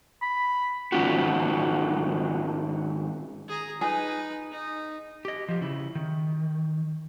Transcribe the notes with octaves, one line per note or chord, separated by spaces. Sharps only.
B5
G#2 D#3 G3 C#4 F4 F#4
G#4 A#5
D#4 G#4 B4
D#4
G4 D#5
F3 G4
C#3 E4
D#3